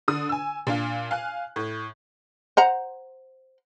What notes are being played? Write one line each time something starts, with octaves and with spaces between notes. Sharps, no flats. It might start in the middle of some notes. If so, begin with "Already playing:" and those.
D3 D#6
G#5 E6
A#2 D4 F5
F5 G#5 F#6
A2
C5 F#5 A#5